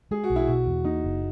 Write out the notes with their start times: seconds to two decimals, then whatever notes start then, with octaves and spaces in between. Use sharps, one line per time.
0.11 G#3 G#4
0.24 F#4
0.30 B1
0.36 E4
0.47 B2 F#4
0.66 E2
0.85 A#3 D#4
1.04 F#1